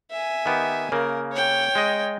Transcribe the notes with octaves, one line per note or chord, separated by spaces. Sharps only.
E5 G#5
D#3 B3 G4
C#3 A#3 A#4
C#5 G5
G#3 D#5